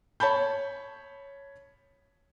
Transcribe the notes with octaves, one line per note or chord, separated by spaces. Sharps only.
C#5 A5 B5 G6